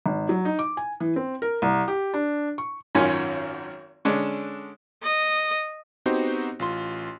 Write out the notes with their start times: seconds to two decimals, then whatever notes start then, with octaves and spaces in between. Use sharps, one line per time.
0.06 G#1
0.29 F#3
0.45 D#4
0.59 D6
0.77 G#5
1.00 E3
1.16 C4
1.42 A#4
1.62 C2
1.88 G4
2.14 D4
2.58 C#6
2.95 G#1 F#2 D#3 C#4 F4 G#5
4.05 D3 G#3 C#4 D4
5.03 D#5
6.06 B3 C4 D#4 F#4 G4 C5
6.59 A1 F4 C6